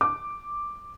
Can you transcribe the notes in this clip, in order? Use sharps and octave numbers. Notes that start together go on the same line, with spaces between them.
D6